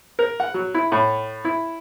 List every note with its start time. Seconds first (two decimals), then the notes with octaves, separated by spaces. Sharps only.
0.19 A#4
0.40 F#5
0.54 F#3
0.74 E4
0.92 A2
1.45 E4